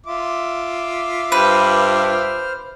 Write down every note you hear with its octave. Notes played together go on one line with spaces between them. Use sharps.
F4 E5 D6
G2 B4 C5 F6